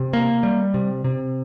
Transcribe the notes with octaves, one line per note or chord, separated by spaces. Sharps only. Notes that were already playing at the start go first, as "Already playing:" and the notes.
Already playing: C3
A#3
G3
C3
C3